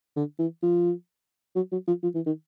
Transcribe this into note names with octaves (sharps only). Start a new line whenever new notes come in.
D3
E3
F3
F#3
F#3
F3
F3
E3
D#3